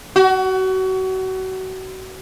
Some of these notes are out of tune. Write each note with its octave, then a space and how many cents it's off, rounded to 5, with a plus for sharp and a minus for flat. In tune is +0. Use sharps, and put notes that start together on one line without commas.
F#4 +30